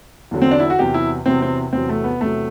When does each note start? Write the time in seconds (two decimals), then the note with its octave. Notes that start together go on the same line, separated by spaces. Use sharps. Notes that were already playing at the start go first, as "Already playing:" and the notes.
0.31 E2 D3 F#3
0.42 C4
0.51 D4
0.60 E4
0.70 F#4
0.78 E2 C3 F#3 G4
0.94 E4
1.26 E2 C3 F#3 C4
1.42 C4
1.72 E2 C3 F#3 C4
1.89 A3
2.04 B3
2.20 E2 C3 F#3 A3